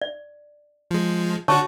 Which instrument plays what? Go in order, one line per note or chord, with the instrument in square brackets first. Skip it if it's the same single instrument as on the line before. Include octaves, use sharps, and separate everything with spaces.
[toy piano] D5
[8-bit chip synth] F3 G#3
[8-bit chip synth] D3 D4 F#4 [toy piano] C#5 A5 C#6